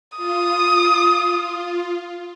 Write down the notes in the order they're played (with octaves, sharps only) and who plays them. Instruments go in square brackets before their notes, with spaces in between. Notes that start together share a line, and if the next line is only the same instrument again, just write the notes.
[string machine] F4 [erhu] D#6